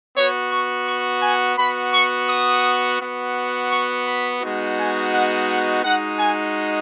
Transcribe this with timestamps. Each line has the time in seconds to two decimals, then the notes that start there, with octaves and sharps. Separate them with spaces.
0.16 B3 F#4 C#5
0.51 C#6
0.88 C#6
1.22 G#5
1.58 B3 F#4 B5
1.94 C#6
2.29 D#6
3.00 B3 F#4
3.72 C#6
4.07 B5
4.42 G#3 B3 D#4 F#4
4.78 G#5
5.13 F#5
5.48 F#5
5.84 G#3 D#4 F#4 F#5
6.20 G#5